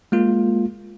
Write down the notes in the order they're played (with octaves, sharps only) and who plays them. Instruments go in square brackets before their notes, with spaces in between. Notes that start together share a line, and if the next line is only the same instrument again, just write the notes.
[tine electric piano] G#3 A#3 F4